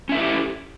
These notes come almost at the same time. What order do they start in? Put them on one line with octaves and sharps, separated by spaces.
C#4 E5 A4 E4 G4